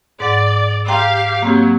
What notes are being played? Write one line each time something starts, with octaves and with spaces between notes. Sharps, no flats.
G#2 D5 F#5
G4 F5 G5 A#5 C6
F#3 A#3 C4 G4